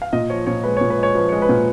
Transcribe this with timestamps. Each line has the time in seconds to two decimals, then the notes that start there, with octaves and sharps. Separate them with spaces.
0.02 F5
0.13 A#2 D#5
0.30 F3 C#5
0.46 A#2 C#5
0.64 G#3 B4
0.77 A#2 C#5
0.90 B4
0.98 G#3 C#5
1.15 F3 B4
1.29 G#3 C#5
1.42 B4
1.49 A#2